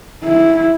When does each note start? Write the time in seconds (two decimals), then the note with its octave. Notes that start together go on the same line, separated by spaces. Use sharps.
0.24 E4